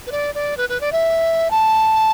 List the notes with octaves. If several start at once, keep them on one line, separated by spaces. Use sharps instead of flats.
B4
D5
D5
B4
B4
D5
E5
A5